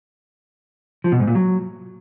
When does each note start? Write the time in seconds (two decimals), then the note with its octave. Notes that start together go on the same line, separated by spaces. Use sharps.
1.04 F3
1.12 B2
1.20 G#2
1.27 A#2
1.35 F#3